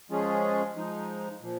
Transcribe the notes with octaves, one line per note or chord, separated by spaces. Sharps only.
F3 G#3 C#4 F4 G#4
F3 G#3 D#4
A#2 F3